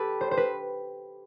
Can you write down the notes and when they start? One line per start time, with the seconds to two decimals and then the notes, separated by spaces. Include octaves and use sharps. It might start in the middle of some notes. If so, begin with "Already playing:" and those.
Already playing: G4 A4 B4
0.21 C5
0.31 C5
0.37 B4